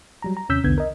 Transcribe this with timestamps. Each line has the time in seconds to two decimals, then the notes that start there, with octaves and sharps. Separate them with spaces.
0.22 F#3 G3 A#5
0.37 A#5
0.49 D#2 C3 C#4 E6 G6 B6
0.64 B1 E2 D3 B3 G6 G#6
0.78 A#4 D#5